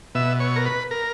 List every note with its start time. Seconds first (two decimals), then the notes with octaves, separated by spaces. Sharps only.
0.15 B2 E5
0.40 C#5
0.56 A#4
0.66 B4
0.91 A#4